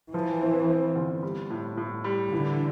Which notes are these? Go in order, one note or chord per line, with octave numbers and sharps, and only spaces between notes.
E3 F3
C4
C4
G1
G3
A2
A2
G3
D3 E3